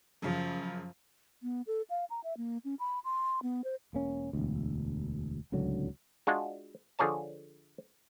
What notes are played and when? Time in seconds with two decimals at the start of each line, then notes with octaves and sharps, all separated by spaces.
0.22 F#2 C#3 F3
1.43 B3
1.67 A4
1.90 F5
2.10 A#5
2.24 E5
2.37 A#3
2.65 C#4
2.80 B5
3.04 C6
3.43 B3
3.64 C5
3.93 E1 A#3 C#4
4.33 E1 D2
5.52 D1 C#2 D3 F#3
6.27 G#3 D4 F4 F#4
6.99 D3 F3 G#4 C#5 A5